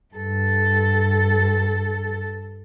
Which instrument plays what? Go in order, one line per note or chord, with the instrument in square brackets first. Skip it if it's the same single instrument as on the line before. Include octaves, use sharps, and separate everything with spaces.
[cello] G2 A4